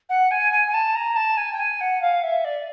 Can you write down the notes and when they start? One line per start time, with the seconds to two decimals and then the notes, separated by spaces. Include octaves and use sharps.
0.09 F#5
0.31 G#5
0.52 G#5
0.67 G#5
0.74 A5
0.95 A#5
1.16 A5
1.37 G#5
1.52 G5
1.59 G#5
1.81 F#5
2.02 F5
2.23 E5
2.45 D5